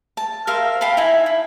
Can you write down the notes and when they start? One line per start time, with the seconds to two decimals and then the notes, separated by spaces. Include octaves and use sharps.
0.17 A5
0.47 A#4 C5 E5 F5
0.81 F5 G5 A5 B5
0.97 D#4 E4 E5 G#5
1.26 E4